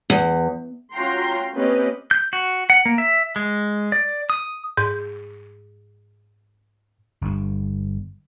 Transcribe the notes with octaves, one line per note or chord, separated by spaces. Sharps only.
E2
C#4 F4 F#4 G5 A#5 C6
A#3 C4 C#4 G4 B4 D#5
G6
F#4
F#5
A#3
E5
G#3
D5
D#6
G#2 G6
G1 G2